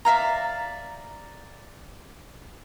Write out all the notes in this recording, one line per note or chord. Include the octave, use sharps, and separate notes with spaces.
D5 E5 F5 A#5